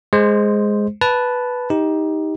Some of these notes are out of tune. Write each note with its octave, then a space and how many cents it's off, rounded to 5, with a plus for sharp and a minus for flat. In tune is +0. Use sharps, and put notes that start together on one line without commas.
G#3 +0 C5 +0
B4 +0 A5 -10
D#4 +15 G4 +10